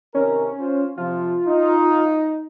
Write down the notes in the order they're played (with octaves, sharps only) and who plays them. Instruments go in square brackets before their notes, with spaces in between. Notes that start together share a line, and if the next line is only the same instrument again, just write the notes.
[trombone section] C3 D#3 A#4 [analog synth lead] C#4
[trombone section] F4 C5
[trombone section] C3 F3 [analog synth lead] F4
[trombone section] D#4